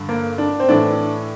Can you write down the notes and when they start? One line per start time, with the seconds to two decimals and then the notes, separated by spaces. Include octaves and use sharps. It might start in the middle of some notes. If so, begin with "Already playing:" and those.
Already playing: G2 D3
0.09 A#3
0.38 D4
0.60 C4
0.69 A2 E3 D4